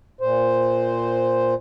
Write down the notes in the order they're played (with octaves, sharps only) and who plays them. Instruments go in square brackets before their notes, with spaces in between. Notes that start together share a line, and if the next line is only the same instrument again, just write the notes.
[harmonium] A#2 C5